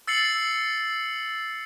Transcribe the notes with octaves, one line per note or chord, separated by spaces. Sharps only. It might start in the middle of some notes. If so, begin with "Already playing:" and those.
E6 A6 C7 C#7 F#7